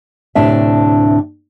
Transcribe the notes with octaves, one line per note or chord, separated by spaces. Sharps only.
D2 A2 C3 D4 E5